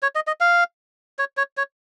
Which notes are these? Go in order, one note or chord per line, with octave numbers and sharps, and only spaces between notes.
C#5
D#5
D#5
F5
C#5
C#5
C#5